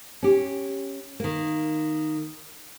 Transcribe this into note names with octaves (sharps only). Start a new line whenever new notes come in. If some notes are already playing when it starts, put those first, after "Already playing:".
C#4 G4
D#3 A#3